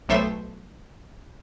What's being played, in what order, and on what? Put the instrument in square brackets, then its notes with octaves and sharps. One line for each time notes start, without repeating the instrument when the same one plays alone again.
[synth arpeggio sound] B1 B2 A3 C5 E5